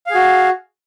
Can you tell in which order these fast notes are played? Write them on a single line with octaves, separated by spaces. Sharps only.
F5 G#4 F#4